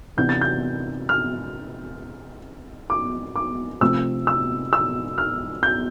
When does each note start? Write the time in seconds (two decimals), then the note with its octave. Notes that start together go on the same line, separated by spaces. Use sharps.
0.17 C3 E3 B3 D4 G6
0.29 A6
0.41 G6
1.09 F6
2.90 D6
3.36 D6
3.81 C3 F3 A3 C4 E6
4.27 E6
4.73 E6
5.18 F6
5.63 G6